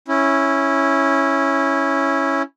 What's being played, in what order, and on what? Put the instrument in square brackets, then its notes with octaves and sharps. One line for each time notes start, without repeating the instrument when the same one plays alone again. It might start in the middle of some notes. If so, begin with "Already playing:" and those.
[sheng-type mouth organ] C#4 E4